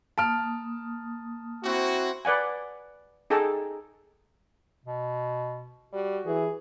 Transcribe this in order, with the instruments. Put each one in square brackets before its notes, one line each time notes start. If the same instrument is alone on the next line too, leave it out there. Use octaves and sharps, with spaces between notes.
[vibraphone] A#3 D#6 [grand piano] A5 F6
[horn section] C4 E4 F#4
[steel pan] B4 D5 F#5 G#5
D#4 G#4 A4 G5 A5
[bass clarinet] B2
[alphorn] G3 [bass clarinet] F#4
[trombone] E3 [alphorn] G#4